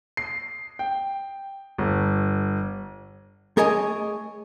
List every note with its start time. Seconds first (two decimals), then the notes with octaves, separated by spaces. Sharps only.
0.17 C7
0.79 G5
1.78 G1
3.57 A3 G#4 A#4 C#5 D#5 G#5